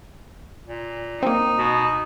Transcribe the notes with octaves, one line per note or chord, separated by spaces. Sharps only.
A#2
A#3 C4 D#4
B2